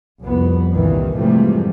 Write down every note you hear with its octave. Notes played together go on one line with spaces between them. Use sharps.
C2 F2 B3
G1 C2 A#2 D#3 E3
G#2 C3 E3 F3 G3 A3